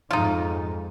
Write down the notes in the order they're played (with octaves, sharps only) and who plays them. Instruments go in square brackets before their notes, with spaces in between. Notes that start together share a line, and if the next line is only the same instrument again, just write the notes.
[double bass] F2 G#2 [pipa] D#4 F4